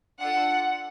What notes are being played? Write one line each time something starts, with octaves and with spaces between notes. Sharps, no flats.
D4 F4 A4 F#5